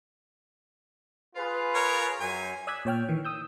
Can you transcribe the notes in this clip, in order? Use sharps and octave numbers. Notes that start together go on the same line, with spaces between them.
F4 G#4 B4
A#4 C#5
F#2 G#5
D5 D#6 E6 F#6 G#6 B6
A#2 C#5 G5 F6
D#3 E3
D#6 E6 G6